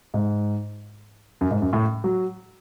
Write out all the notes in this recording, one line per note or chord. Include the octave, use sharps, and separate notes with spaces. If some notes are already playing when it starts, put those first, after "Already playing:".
G#2
F#2
G#2
F#2
A2
F#3